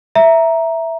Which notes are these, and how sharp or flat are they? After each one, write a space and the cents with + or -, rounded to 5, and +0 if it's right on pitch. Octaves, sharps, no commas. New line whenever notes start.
E5 +0 A#5 +5